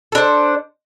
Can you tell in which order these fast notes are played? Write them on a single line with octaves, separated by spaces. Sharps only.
A4 D4 C5